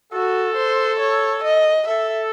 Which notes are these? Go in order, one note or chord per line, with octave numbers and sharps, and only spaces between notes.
F#4 A4
C5
C#5
D#5
A4 E5